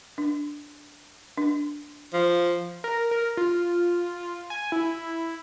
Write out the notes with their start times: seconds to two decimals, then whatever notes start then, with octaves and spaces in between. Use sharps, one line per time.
0.18 D4
1.38 D4
2.13 F3
2.84 A#4
3.11 A#4
3.37 F4
4.50 G#5
4.72 E4